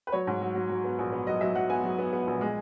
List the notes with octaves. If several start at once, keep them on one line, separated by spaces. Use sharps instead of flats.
B4
F#3 C#5
G#2
F#3
F#3
F#3
B3
A#1
B3
F#3 D#5
F#3 E5
F#3 F#5
B3 G#5
F#3
B3
B3
A#1
G#3